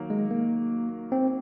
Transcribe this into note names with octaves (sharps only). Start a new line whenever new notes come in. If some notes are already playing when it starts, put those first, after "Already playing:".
Already playing: D#3 F#3 A#3
G#3
A#3
C4